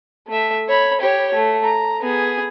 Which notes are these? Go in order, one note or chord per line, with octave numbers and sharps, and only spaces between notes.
A3 E5
C#5 B5
G4 C#5
A3
A#5
B3 G#4